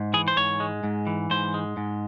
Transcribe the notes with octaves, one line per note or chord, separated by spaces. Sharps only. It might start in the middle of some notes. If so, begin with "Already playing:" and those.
Already playing: G#2
E3 G#4
C5
G#2 C#5
G#3
G#2
E3
G#2 C5
G#3
G#2